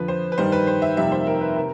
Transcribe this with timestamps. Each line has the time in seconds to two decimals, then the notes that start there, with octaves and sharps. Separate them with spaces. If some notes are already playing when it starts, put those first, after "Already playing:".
Already playing: F2 D3 F3 B4
0.08 C5
0.32 B4
0.38 G2 D#3 G3 C5
0.52 B4
0.67 C5
0.82 E5
0.97 F2 C3 D#3 G3 A#3 E5
1.12 C5
1.27 A#4
1.41 B4
1.56 C3 A#4